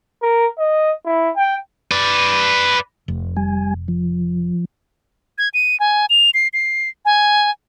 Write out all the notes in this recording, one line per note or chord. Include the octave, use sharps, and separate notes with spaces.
A#4
D#5
E4
G5
B4 D5
F1
G3 G#5
F3
G#6
D#7
G#5
F7
C7
C7
G#5